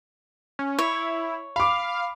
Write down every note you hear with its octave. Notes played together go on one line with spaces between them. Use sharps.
C#4
E4 C#5
F5 B5 D6